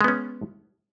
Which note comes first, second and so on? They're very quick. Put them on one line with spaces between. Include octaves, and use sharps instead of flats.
G#3 B3 C#4